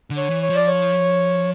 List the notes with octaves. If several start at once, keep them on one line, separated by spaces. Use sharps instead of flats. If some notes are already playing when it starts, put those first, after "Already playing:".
D3
C#5
E3
C#5
F3
D5
C#5